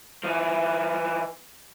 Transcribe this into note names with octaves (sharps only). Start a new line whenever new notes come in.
E3 F3